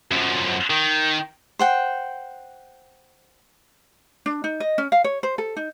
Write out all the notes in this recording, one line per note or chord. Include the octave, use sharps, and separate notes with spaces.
F#2 F3
D#3
C5 F#5 G5
D4
D#4
D#5
C#4
F5
C#5
C5
A4
D#4